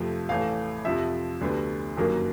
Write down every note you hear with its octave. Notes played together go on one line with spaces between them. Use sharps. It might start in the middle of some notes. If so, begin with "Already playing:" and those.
Already playing: F2 C3 F3 A3
A1 A2 E3 A3 F5
F2 C3 F3 E5
D2 D3 G3 B3
G1 F#2 D#3 F#3 A#3